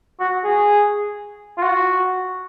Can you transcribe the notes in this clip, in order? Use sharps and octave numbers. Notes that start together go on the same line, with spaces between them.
F#4
G#4
F4
F#4